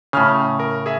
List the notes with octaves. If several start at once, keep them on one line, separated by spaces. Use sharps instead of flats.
A2 C#3 C#4 F6
A#4
G#4 E5